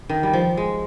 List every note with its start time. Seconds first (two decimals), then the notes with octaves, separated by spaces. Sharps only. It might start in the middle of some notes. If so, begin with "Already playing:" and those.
0.09 D#3
0.23 G3
0.33 F3
0.57 G#3